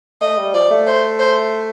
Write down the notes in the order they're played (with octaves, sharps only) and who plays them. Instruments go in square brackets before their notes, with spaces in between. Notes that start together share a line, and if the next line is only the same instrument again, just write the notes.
[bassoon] A3 [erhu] D#5
[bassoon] G3
[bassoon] F3 [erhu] D5
[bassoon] A3
[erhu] C5
C5